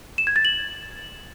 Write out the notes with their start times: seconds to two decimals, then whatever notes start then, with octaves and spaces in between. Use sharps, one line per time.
0.18 E7
0.27 G#6
0.36 A6
0.45 F#7